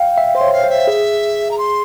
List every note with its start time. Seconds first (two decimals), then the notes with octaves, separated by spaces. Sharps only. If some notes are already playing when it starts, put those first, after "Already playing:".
Already playing: F5 G5
0.18 E5
0.35 C5 C6
0.41 C#5
0.52 F5
0.64 C5
0.69 E5
0.87 G#4
1.50 A#5
1.58 C6